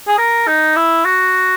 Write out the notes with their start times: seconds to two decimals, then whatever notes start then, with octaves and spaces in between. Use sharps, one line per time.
0.08 G#4
0.18 A#4
0.47 D#4
0.76 E4
1.05 F#4